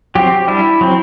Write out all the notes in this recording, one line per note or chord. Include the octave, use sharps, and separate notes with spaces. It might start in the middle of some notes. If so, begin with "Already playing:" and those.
F#3 C4 G4
G3 D4 E4
F#3 C4